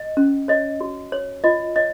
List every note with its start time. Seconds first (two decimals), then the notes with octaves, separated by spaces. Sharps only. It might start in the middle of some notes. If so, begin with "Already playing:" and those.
Already playing: D#5
0.17 C#4
0.48 C#5 D#5
0.81 F#4
1.12 C#5
1.44 F4 D#5
1.76 C#5 D#5